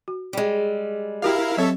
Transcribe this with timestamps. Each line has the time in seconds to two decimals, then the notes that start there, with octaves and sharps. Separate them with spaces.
0.08 F#4
0.33 G3 G#3
1.22 E4 F#4 G4 A#4 F5 G5
1.57 F#3 C4 A4 C#5 E5